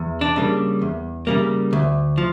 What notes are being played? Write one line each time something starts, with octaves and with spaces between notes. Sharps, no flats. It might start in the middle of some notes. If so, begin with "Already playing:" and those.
Already playing: E2
D4
C#3 G3 A#3
E2
C#3 G3 A#3
D2
F3